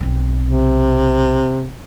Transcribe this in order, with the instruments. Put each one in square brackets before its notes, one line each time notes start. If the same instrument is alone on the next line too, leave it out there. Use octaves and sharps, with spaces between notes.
[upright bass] B1 C4
[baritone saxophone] C3